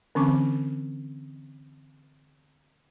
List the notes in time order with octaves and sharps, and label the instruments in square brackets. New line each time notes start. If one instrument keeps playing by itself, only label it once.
[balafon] D3 E3 C4 C#4 C#6 D6